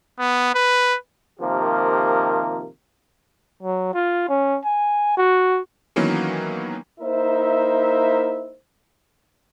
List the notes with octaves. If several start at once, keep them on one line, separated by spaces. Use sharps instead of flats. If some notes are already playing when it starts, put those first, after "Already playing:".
B3
B4
C3 D#3 F3 A#3 G4 A#4
F#3
F4
C#4
G#5
F#4
D#3 E3 F#3 A#3 B3 C#4
A#3 D#4 E4 A#4 C5 E5